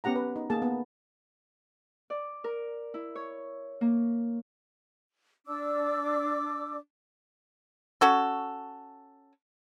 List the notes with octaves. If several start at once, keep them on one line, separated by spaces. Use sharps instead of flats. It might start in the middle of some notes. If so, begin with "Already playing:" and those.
B3 C#4 G4 F#5 A#5
B4
D#4
A#3 G#4 A5
B3
D5
A#4
E4
C#5
A#3
D4 D5 D6 E6
C#4 F#4 A4